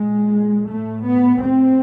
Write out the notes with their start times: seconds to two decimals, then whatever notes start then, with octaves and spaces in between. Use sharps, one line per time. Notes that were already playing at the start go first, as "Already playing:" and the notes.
Already playing: A#2 G#3
0.68 A2 A3
1.05 B3
1.42 A2 C4